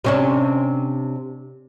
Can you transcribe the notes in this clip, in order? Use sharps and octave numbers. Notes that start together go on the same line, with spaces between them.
C3 C#4 D4